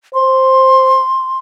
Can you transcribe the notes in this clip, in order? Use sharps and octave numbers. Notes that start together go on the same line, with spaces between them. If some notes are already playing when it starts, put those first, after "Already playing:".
C5 C6